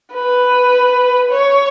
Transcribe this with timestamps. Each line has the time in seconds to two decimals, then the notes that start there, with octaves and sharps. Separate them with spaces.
0.14 B4
1.31 C#5